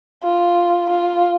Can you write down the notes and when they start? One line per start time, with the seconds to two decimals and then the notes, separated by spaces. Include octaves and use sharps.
0.23 F4
0.90 F4